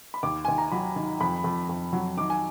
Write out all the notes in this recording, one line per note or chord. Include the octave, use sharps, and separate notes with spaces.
B5
D#2 D6
D#2 G#5
A#5
F#3 B5
D#3
F2 B5
F2
F2
F#3
D#3 D6
G#5